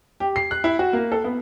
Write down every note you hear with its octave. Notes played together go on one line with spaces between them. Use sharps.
G4
C7
F#6
E4
F#4
A#3
A4
B3